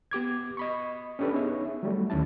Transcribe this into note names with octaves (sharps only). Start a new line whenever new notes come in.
B3 G4 D6 G#6
D#5 B5 C#6
C#4 D4 G4 A4 B4
B3 D#4 G#4 C#5 E5
F#3 G3 A3
D2 D#3 C#4 E4 A5